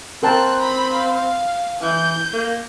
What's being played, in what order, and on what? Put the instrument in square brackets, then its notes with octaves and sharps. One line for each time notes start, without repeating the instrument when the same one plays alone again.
[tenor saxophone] C4 [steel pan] A#4 G5 A5 [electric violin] F#6
[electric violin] A#5 B5
F5
[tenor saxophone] E3 [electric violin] G6
[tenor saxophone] A#3